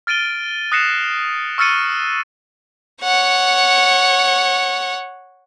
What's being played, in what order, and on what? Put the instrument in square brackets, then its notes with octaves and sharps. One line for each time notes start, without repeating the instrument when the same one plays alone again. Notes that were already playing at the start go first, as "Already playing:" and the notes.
[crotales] F6 A6 D7 D#7 G7
D#6 F#6 A#6 C7 C#7 E7
C#6 E6 F6 A6 C#7 D#7
[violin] C#5 F#5